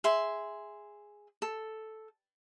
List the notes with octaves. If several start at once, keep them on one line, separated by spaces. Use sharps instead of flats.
G#4 E5 C6
A4